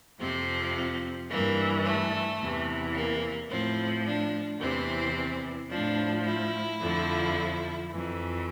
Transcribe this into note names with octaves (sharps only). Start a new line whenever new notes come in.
F2 C3 F3 C4
G2 E3 A#3
A3
E2 C3 E3
A#3
A2 F3 C4
D4
E2 C3 E3 C4
A2 F3 D4
E4
F2 D3 F3
F2 E3